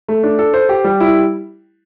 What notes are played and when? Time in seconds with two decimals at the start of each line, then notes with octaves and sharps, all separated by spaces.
0.08 A3
0.23 D4
0.39 A4
0.54 C5
0.69 G4
0.84 G3
1.00 E4